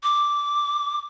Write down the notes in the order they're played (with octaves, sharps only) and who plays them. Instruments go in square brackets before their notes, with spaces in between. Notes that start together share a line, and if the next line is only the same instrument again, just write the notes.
[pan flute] D6